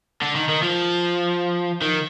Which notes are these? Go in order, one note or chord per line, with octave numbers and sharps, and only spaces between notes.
D3
D#3
D#3
F3
D#3